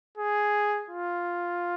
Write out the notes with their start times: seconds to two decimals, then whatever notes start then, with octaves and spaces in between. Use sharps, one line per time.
0.18 G#4
0.90 F4